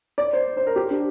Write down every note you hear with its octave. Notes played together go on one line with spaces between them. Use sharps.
D5
C5
C5
A#4
G4
D4